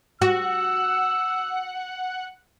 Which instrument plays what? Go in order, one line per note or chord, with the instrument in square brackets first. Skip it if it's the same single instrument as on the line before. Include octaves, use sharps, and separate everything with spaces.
[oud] F#4 [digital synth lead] F#5 [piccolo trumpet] E6